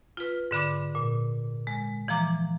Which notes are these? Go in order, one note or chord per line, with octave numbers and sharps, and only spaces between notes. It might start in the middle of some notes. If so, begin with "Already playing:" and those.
F4 B4
G#2 D3 B5 D6
A#2
G#3
E3 F3 A#5 D6